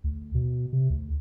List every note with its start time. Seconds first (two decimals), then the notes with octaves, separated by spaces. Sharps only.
0.04 D2
0.34 B2
0.72 C3
0.90 D2